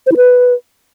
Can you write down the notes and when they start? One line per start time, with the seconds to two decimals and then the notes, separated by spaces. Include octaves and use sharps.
0.07 C5
0.12 E4
0.17 B4